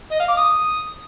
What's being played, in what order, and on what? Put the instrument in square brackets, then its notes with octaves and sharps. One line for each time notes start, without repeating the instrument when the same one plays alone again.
[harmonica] D#5
F5
D6
D#6